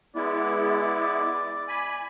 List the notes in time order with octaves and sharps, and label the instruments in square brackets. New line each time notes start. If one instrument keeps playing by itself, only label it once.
[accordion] G#3 B3 E4 [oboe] D5
[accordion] G#5 B5